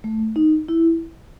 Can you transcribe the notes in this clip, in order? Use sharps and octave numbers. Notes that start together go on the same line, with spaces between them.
A3
D#4
E4